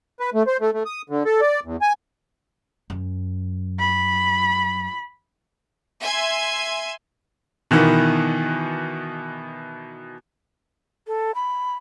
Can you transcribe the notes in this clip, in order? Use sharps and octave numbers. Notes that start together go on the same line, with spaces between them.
B4
A3
C5
A3
A3
D#6
D3
A4
D5
E2
G#5
F#2
B5
E5 G#5 C6 G#6
B2 D#3 E3 B3
A4
B5